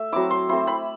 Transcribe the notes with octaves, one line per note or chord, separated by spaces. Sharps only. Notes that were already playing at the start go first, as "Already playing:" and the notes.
Already playing: A3 E5
F#3 C4 E4 D6
C6
A3 C4 E4 C6
B5